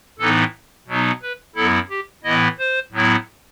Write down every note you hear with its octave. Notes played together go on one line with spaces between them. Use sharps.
A2 E3 B3 D#4 A4
B2 F#3 B3 D#4
B4
F#2 F#3 B3 E4 A4
G4
A2 E3 B3 E4 D#5
C5
A2 F#3 B3 E4